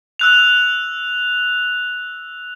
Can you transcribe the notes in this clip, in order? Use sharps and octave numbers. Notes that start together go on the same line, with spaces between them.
E6 F#6 F7